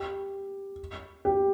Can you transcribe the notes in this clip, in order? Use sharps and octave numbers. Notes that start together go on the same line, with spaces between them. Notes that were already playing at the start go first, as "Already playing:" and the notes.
Already playing: G4
G4